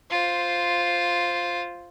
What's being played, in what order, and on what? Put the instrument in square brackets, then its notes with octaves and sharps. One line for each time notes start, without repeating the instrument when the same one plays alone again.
[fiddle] F4 C5